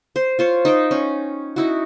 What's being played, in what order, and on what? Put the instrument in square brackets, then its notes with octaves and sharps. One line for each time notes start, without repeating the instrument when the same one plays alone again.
[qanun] C5
F4 C5 C#5
D#4 C5 G5
C#4
D#4 E4 F#4